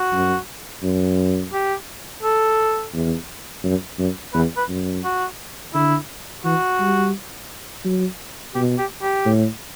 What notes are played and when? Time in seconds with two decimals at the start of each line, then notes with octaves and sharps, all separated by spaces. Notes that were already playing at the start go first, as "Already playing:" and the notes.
Already playing: F#4
0.13 F#2
0.82 F#2
1.53 G4
2.23 A4
2.93 E2
3.64 F#2
3.98 F#2
4.33 E2 B4
4.57 B4
4.69 F#2
5.04 F#4
5.74 D3 E4
6.44 E3 F#4
6.80 G3
7.84 F#3
8.55 B2 G4
8.78 G4
9.02 G4
9.25 A2